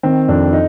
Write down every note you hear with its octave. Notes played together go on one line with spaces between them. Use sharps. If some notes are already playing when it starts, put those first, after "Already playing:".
D#3 C4
F2 D4
D#4